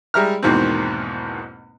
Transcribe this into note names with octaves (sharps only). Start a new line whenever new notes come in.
G3 G#3 E5 A#5 F6
E2 G#2 B2 D#3 A#3 C4